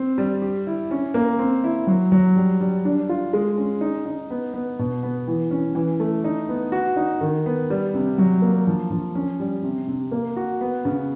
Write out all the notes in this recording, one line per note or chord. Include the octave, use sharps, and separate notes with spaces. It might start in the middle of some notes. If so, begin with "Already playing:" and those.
Already playing: C4
G3
G4
E4
C#4
A#3
C4
E4
F#3
F#3
G3
G3
D4
F4
G#3
C#4
D#4
D#4
B3
B3
B2
B3
E3
C#4
E3
A3
D#4
B3
F#4
D#4
D#3
B3
G3
C3
F#3
A#3
F3
F3
C#4
G3
C3
C3
A#3
F#4
B3
C#3